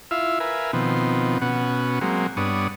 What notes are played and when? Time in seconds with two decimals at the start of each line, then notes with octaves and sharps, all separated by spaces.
0.11 E4 F4 E5 F5
0.40 A#4 B4 E5 F5 G#5
0.73 B2 D#3 F3 B3 C4
1.42 B2 B3 C#4 F#4
2.01 F#3 G#3 A#3 C4
2.37 G2 B3 D4 C#5 D#6